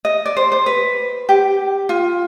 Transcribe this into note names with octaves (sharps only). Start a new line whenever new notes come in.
D#5
D5
C5
C5
B4
G4
F4